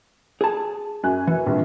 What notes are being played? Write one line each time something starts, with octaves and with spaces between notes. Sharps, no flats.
G#4 A5
F#2 G#5 F#6
E3
A#1 G2 C3